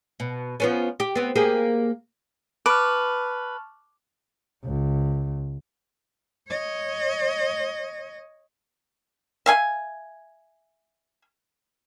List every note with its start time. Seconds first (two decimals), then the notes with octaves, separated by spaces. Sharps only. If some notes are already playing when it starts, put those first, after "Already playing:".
0.20 B2
0.60 F3 B3 C#4
1.00 G4
1.16 B3 C4
1.36 A#3 G4 G#4
2.66 B4 A5 C#6 D6 F6
4.64 C#2
6.48 C#5 D#5
9.46 E5 F5 G#5